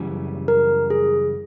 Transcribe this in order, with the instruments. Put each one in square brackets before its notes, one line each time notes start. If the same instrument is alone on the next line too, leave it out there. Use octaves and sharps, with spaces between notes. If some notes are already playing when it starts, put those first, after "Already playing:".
Already playing: [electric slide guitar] F#2 C#3 E3 G3
[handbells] A#4
G#4